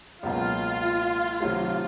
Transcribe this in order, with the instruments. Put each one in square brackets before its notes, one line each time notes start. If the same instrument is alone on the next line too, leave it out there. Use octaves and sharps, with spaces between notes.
[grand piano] C#2 B2 F#3 A#3 [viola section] F4
[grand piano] C3 D#3 F#3 A3